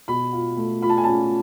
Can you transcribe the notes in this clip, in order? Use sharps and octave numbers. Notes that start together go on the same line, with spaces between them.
B2 B5
F4
A3
F4 B5
A5
G#5
C#4 A5